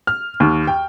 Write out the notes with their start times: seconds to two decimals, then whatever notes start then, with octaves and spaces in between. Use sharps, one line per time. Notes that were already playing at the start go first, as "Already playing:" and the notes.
0.07 F6
0.40 D#2
0.67 G5